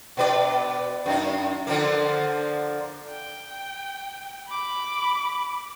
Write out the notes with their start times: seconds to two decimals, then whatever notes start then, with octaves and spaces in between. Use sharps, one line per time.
0.17 B2 B4 D5
1.06 F#2 D#4
1.67 D3 F3 A#3
3.08 G5
4.51 B5 D6